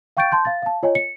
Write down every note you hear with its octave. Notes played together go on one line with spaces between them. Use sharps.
F5 G5 C#6 G6 A6 D7
A5 C6 G6
F5 A6
F5 A5
F4 C#5 D#5 G#5
C#7